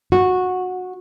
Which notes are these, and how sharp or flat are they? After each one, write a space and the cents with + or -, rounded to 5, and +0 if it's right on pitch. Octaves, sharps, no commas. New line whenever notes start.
F#4 -15